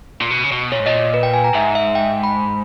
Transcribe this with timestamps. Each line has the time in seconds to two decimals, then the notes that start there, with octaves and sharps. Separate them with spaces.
0.22 A#2
0.31 B2
0.44 C#3
0.52 B2
0.72 A#2 C#5
0.80 G#2
0.86 A#2 D#5
1.14 B4
1.23 G5
1.34 G#5
1.44 A#5
1.54 G#2 E5
1.75 E5
1.95 G5
2.23 B5